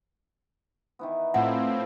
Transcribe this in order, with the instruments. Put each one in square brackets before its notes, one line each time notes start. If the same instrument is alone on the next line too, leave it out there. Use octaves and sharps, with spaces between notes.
[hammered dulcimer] D#3 E3 B3
[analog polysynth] A2 C4 [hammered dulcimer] F3 E4 [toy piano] F#5